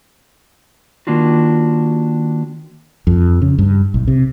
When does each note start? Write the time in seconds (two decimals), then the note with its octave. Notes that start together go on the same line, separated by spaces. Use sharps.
1.07 D#3 A#3 D4 F4 F#4
3.07 F2
3.42 C#3
3.58 G2
3.94 B1
4.08 C3